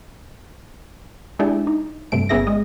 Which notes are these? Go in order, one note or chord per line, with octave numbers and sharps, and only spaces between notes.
G#3 D4 E4 G4 G#4
D#4
G2 C3 A3 D7
G1 B3 C#4 G#4 E5 A#6
G#3 D#5